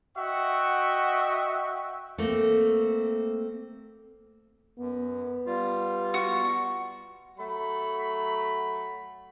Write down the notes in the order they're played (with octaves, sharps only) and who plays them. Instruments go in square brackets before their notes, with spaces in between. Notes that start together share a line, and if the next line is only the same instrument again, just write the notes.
[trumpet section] F#4 D#5 E5 F#5 G5 C#6
[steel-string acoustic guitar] A3 A#3 C4
[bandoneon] F#2 [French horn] B3
[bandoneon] G3 F4
[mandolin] F#4 [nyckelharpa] C#6
[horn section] F#3 A3 B5